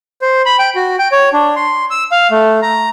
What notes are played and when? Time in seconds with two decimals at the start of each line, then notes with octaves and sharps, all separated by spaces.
0.22 C5
0.46 B5
0.59 G5
0.75 F#4
0.99 G5
1.12 C#5
1.33 D4
1.56 C6
1.91 E6
2.12 F5
2.31 A3
2.62 A#5